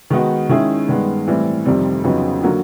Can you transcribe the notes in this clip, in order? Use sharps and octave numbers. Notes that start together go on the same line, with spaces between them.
D#3 G#3 B3 D#4 F#4
D#3 G#3 C#4 E4 G#4
G2 D#3 G#3 B3
A2 E3 G3 C4
F2 C3 D#3 G3 C4
F2 C#3 F#3 B3 D#4
D3 F#3 A#3